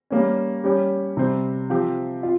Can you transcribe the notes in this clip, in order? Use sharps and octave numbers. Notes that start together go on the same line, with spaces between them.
G3 A#3 C#4
G3 C#4 G4
C3 G3 C4
F3 C4 G4
F4